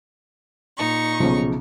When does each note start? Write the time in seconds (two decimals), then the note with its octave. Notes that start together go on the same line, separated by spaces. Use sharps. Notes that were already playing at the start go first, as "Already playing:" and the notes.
0.76 A#2 D#4 C#6
1.20 B1 C#3 F3